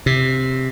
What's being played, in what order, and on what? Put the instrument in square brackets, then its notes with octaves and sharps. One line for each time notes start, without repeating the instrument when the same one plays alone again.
[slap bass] C3